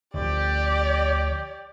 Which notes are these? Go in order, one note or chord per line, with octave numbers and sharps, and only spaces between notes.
D2 F3 G4 D5